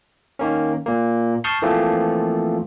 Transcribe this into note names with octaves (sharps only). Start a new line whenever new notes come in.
D#3 A#3 C#4
A#2 A#3
A5 C#6 D#6 F6 G6 C7
E3 F3 A3 A#3 C4 F4